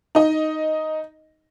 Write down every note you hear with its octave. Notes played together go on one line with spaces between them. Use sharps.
D#4 D#5